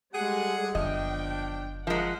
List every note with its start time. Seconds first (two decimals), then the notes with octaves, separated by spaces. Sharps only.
0.14 G3 G#3 G#4 A4 F#5
0.75 F#1 D3 F3 B3 D4 D#5 G5
1.87 C#3 F3 G#3 A#4 F#5